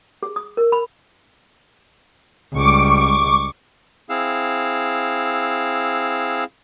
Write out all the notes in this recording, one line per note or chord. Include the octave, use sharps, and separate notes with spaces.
G#4
D#6
A#4
B5
C#2 G3 C#6 D6
C4 E4 G#4 F5 E6